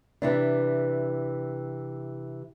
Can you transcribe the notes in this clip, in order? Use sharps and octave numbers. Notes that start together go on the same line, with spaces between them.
C3 E3 D4